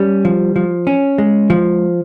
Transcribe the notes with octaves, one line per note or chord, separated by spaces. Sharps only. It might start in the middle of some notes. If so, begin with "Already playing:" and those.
Already playing: G3 C#4
F3
F3
C#4
G#3
F3